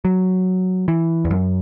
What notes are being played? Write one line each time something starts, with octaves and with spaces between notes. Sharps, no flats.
F#3
E3
E2
F#2